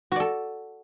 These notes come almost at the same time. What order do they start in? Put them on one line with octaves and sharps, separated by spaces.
F#4 D5 A4